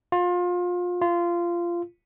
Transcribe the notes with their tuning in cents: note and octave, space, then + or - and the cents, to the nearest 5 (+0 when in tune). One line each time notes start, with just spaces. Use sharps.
F4 +25
F4 -20